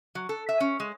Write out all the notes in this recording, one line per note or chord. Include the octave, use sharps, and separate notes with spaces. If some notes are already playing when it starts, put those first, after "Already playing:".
F#3
A4
E5
C#4
G#3